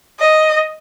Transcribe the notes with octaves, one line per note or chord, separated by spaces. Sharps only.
D#5